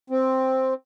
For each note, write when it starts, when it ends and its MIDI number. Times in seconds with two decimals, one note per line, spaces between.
0.10 0.74 60